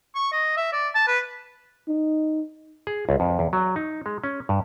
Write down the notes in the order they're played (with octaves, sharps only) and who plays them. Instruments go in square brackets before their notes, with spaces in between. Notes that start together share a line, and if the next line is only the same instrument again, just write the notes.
[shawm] C#6
D#5
E5
D5
A5
B4
[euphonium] D#4
[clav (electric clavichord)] G#4
C#2
F2
E2
F#3
D#4
G#3
C#4
G2